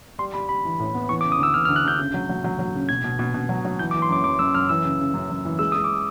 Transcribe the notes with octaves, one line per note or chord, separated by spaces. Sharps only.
G3 C6
G3 B5
G3 B5
E3
A2
B3
E3 C#6
D6
C#3
D#6
D2 E6
E3 F6
F6
D2
F#6
D2 G6
C#3
F#3
F#3
F#3
F#3
C#3
B2 G#6
B2
B2
B2
F#3
F#3
E3 G6
D6
E3
C6
F#2 D6
F#2 D6
F#2 E6
F#2 F6
E3 E6
C#3
C#3
F#2
F#2
E3
G#3 E6
G#3 D#6
D6